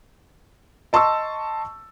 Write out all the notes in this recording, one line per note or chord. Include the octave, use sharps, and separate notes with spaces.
D#5 A5 C6 C#6 E6